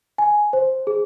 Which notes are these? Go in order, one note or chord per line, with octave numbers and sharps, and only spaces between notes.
G#5
C5
G#4